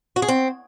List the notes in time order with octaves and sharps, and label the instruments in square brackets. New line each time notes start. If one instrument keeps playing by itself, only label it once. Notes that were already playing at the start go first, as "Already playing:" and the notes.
[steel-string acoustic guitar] F#4
G#4
C4